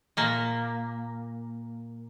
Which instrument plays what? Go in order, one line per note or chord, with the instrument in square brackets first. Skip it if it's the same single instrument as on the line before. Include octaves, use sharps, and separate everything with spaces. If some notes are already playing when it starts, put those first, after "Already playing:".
[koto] A#2 A#3